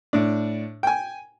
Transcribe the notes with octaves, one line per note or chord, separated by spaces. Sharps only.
A2 D4
G5 G#5